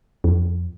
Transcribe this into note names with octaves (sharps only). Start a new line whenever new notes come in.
F2